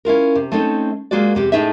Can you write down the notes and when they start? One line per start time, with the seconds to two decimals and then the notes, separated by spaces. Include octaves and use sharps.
0.05 C#4 E4 F4 A#4
0.36 C3
0.52 A3 C4 C#4 D#4 A4
1.11 G#3 A#3 F4 F#4 D5
1.35 E2 C3 G4
1.52 A2 A3 D#4 G#4 E5